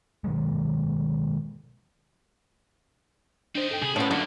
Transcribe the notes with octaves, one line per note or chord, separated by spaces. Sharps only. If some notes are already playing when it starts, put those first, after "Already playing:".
B2 D#3 F#3 G#3
C4 D4 D#4 C5
A4 G5
C3 G3 G#4 B5
A2 F3 B3 C#4 E4 C#5
C2 F#2 D3 A#3